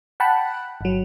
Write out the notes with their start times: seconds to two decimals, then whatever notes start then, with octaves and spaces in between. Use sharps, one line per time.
0.20 F#5 G5 A5 B5 F#6
0.81 G1 F#3